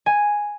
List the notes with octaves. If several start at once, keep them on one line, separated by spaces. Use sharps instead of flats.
G#5